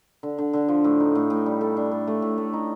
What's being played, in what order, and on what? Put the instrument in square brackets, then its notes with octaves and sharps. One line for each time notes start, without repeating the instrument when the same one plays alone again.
[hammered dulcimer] D3
D3
D3
F3
A2
D#4
A2
A2
G3
A4
D4
A4
A3
A2
A3
D#4